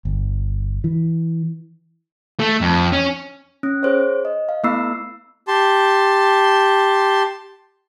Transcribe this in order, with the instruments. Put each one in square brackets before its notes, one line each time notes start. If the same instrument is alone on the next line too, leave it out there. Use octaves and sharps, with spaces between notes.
[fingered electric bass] G1
E3
[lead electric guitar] A3
F2
C#4
[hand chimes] C#4
G#4 C5 C#5
D#5
F5
A3 B3 E4 B5 E6 C7
[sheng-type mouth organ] G4 A5 C6